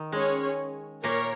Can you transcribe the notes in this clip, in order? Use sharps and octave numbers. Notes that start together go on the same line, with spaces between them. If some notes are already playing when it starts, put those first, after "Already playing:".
Already playing: D#3
G#3 C#4 G#4 C#5
A#2 A#3 A#4 C#5